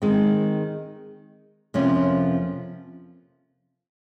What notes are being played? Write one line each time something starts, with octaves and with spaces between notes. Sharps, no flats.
D#3 G#3 C4
F2 C3 F3 A#3 C#4